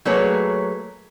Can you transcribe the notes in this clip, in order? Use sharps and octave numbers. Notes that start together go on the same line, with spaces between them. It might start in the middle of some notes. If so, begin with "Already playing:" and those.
F#3 A3 A#3 G#4 B4 C#5